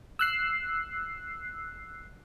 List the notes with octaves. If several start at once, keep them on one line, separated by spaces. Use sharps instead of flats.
E6 F#6 C7